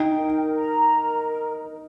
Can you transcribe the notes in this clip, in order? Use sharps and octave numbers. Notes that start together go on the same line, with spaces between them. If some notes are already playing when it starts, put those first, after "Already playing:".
Already playing: D#4 G5
A#4
A#5
A#4